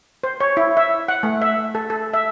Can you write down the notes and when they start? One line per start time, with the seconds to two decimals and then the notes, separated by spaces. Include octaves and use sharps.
0.23 C5
0.40 C#5
0.57 E4
0.77 E5
1.08 F#5
1.23 A3
1.42 E5
1.75 A4
1.90 A4
2.14 E5